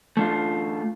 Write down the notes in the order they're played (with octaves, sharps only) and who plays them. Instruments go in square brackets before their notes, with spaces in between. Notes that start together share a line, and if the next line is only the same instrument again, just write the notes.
[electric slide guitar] A3 D4 F4